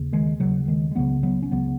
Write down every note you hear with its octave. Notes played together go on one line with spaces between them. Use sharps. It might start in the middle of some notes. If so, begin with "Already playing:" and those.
Already playing: D#2 C#3
D#3 G#3
D#2 C#3 F#3
D#3 G#3
G#3
C#2 C#3 F#3 B3
F#3 B3
C#4
C#2 C#3 F#3 B3